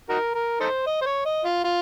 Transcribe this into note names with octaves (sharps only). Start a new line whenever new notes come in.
D#4 F#4 A#4
A#4
D#4 A4 C5
D#5
C5
C#5
D#5
F4
F4